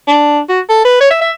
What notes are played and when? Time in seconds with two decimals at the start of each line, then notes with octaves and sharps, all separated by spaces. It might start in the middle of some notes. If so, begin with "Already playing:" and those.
0.07 D4
0.49 F#4
0.69 A4
0.85 B4
1.00 C#5
1.10 E5
1.21 E5